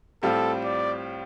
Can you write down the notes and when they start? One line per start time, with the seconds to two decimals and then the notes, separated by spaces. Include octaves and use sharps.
0.23 A2 G3 C4 F4 A4
0.64 D5